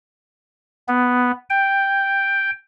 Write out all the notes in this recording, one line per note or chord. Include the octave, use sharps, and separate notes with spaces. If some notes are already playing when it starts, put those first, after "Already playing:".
B3
G5